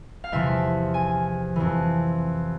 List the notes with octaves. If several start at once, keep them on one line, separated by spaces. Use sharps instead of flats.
F5
E2 C3 F3 E5
G#5
F2 E3